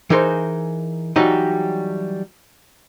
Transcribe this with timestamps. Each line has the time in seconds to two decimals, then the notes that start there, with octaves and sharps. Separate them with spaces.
0.10 E3 D#4 G#4 A#4 C5
1.16 E3 F#3 G3 D#4 G4 D#5